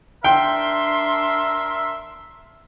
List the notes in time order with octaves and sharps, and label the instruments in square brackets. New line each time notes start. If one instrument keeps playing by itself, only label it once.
[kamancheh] D4 C6 [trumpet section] A#4 E5 [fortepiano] G5